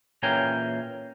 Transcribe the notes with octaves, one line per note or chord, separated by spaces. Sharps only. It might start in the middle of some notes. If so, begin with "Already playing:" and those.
A#2 E3 C#4 G#4 G5 A#5